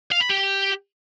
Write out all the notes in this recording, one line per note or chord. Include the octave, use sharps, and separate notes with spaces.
F5
B5
G4